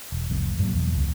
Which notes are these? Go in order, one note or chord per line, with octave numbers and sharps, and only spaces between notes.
E1
C2 F2 A2
G2 A#2 D#3 F#3
E2 B2
C#2